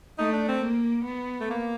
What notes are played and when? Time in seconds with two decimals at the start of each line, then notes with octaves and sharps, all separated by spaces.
0.18 A3 D#4
0.33 D4
0.48 C4
0.62 A#3
1.05 B3
1.40 A3
1.50 A#3